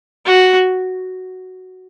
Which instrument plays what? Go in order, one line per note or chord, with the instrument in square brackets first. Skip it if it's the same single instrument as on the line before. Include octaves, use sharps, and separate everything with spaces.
[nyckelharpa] F#4